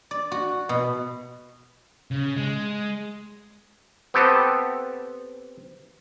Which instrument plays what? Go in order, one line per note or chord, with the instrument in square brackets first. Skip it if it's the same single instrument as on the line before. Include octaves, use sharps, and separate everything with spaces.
[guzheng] D5
F#4
B2
[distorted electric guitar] C#3
G#3
[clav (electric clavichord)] B3 C4 G4 A4